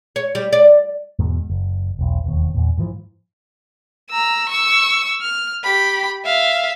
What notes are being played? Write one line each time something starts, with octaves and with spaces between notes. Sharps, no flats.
C#5
G3
D5
E2 G#2 B2
F#1
E1 B1
E1 D#2
E2 A#2
G#2 E3 F3
A#5 E6
C#6 E6
F6
G4 B5
E5 F5